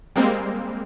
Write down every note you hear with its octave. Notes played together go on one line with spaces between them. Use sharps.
G3 G#3 A#3 C4